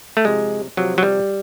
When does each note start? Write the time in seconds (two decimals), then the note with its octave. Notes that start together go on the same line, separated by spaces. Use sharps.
0.17 A3
0.25 C3 F3 G#3
0.77 C3 F3 F#3
0.98 F#3
1.03 G3